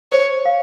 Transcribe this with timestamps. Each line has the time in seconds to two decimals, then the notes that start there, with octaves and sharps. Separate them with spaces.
0.12 C5 C#5
0.45 F5